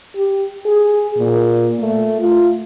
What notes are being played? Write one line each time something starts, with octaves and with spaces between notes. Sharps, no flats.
G4
G#4
A#2
A3
F4